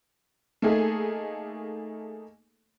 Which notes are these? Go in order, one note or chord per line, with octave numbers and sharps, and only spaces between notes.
A3 A#3 D#4 G#4 A4